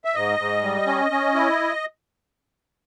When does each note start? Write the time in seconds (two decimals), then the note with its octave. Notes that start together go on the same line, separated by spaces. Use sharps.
0.05 E5
0.15 G#2 D#5
0.39 G#2
0.63 G3
0.86 C#4
1.11 C#4
1.34 E4